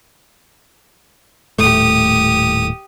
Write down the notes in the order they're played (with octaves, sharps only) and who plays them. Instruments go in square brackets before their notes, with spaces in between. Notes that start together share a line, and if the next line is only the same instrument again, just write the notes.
[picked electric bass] D#1 A2 A3 [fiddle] G4 D#6